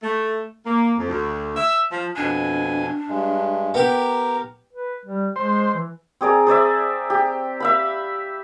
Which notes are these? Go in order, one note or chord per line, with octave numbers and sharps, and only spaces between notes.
A3
A#3
F2
D2
E5
F3
F2 B2 D4 G#5
G2 G#3
B3 G4 A#4 A#5
B4
G3
G#3 C5
E3
C4 G#4 D5 A#5
G#4 C5 D5 E5
G4
E5 F5 B5